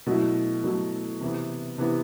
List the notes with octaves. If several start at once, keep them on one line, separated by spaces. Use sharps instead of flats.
B2 F#3 A3 E4
B2 F#3 A3 E4
C3 E3 B3
C3 E3 B3